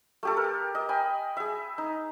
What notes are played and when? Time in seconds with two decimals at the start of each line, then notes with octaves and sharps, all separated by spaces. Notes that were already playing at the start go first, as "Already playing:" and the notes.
0.23 A3 G4 A4
0.37 A#4
0.75 D#5
0.89 G5 G#5 B5
1.37 G#4 E5
1.78 D#4